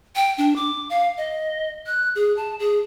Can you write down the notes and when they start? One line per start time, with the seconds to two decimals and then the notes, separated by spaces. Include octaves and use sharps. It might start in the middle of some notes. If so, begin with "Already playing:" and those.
0.16 G5
0.38 D4
0.56 D6
0.90 F5
1.17 D#5
1.87 F#6
2.15 G#4
2.37 A5
2.59 G#4